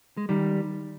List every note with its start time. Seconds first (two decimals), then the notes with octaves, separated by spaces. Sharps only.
0.17 G#3
0.29 D#3 G3